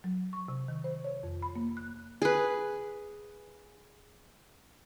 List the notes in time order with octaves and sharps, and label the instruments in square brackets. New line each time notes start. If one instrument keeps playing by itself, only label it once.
[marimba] F#3
C#6
C3
D#3
C5
C#5
F2
B5
A#3
F#6
[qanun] G#4 B4